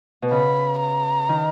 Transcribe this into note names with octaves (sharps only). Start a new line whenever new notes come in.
B2
C#3 B5
A#5
D#3